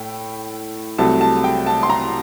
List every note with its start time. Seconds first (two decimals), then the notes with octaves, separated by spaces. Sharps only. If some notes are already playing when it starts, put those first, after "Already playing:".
Already playing: A2 A3 G5
0.98 C2 C3 F#3 A3 A5
1.21 A5
1.44 G5
1.67 A5
1.83 C6
1.90 A#5